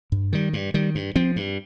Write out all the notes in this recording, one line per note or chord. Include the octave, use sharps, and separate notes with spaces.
G2
D#3 G3
G2
D#3 G3
G2
F3 C4
G2